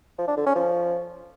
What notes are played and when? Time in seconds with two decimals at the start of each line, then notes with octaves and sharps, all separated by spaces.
0.18 F3
0.28 D4
0.37 D3
0.46 C#4
0.56 F3